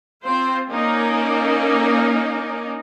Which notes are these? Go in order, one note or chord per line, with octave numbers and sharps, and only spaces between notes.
C4 F4 C5
A#3 C#4 D#4 A#4 D5